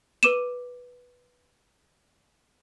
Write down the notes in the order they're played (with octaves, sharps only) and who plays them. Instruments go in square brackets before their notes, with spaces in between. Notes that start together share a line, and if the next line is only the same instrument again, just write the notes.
[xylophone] B4 D6 D#7 E7